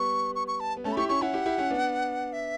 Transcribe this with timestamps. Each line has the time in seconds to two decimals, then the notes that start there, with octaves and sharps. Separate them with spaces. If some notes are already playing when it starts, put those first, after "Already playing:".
Already playing: G3 B3 C#6
0.35 C#6
0.48 C#6
0.60 A5
0.77 B3
0.84 A3 C#4 A5
0.92 B5
0.97 E4 G4 C#6
1.09 C#4 E4 C#6
1.21 C#4 E4 F#5
1.33 E4 G4
1.46 E4 G4
1.58 C#4 E4
1.70 B3 D4
2.33 E5